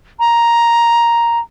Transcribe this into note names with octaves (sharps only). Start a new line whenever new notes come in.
A#5